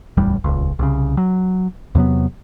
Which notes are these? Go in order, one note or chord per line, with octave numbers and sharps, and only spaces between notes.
D1 A1 E2 G3
D#1 C#2
C2 C#3
F#3
E2 C3 F#3 B3